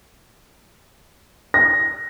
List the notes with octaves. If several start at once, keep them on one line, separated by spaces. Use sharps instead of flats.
A#6